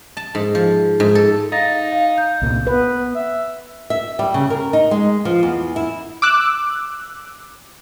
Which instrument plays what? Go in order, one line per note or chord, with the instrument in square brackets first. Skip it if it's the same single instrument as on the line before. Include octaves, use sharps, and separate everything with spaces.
[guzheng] A5
G#2
F3
G#2
A4
[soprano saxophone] D#4 [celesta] F5 A6 A#6
[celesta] F5
G6
[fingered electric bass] C2 A#2
[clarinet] B3 [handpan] B4
[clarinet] E5
[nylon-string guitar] E5
G3
C#3
A#4
D#4
G#3
F3
E2
E4
[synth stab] D6 E6 F#6